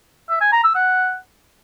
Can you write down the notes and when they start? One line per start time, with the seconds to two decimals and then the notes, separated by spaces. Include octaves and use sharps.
0.30 E5
0.41 G#5
0.52 A#5
0.64 E6
0.75 F#5